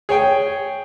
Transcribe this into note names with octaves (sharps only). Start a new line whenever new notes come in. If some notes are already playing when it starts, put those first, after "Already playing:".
G#4 C#5 G5